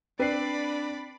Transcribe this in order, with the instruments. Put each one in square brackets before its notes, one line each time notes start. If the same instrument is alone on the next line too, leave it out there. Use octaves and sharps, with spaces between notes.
[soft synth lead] C4 [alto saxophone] D4 [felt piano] B4 C7 [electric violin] D5 B5